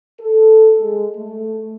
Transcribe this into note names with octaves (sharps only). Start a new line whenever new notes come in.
A4
G#3
A3